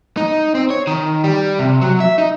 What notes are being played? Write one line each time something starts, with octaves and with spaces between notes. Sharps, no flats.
D#4
C4
C#5
D#3
G3
C3
F#3
E5
D#4